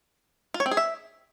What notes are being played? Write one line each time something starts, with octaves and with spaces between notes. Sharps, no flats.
F4
C#5
C4
G#4
E5